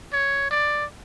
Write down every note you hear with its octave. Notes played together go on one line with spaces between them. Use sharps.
C#5
D5